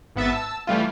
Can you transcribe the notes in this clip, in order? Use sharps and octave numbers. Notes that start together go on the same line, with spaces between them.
G#1 B3 E5 A6
A5 E6
E3 G3 A3 F4